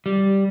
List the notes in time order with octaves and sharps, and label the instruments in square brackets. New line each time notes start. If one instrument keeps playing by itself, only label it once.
[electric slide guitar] G3